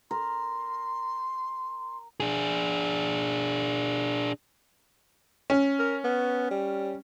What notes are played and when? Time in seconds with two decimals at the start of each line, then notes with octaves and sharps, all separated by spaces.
0.11 A#4 C6
2.20 D4 G#4
5.50 C#4
5.79 A#4
6.04 B3
6.51 G3